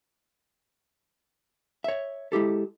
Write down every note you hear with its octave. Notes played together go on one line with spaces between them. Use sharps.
C#5 E5
G#3 E4 G4 A4